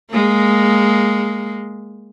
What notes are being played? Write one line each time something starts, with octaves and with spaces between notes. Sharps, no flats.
G#3 A#3